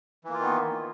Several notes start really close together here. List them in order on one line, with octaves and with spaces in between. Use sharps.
E3 A#3 F4 D#3 B3